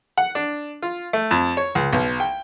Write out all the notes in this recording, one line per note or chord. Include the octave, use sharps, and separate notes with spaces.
F#5
D4
F4
A3
F2
C#5
C#2
B1
G5